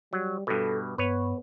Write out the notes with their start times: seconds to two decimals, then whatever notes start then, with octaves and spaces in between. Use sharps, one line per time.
0.13 F#3 G3
0.47 G2 B2 A4
0.98 G2 B3 B4 C#5